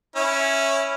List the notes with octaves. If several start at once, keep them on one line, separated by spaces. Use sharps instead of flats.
C#4 E4